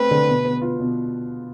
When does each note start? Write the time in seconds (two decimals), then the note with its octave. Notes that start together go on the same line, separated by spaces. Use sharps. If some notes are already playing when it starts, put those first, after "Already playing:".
Already playing: A3 C4 B4
0.11 D3
0.28 B2
0.45 B3
0.61 F4
0.79 B2